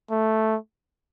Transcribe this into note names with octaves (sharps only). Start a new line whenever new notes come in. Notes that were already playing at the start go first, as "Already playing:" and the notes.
A3